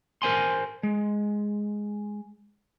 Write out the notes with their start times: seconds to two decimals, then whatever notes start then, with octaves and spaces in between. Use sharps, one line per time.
0.22 A#4 C5 G#5 C6
0.83 G#3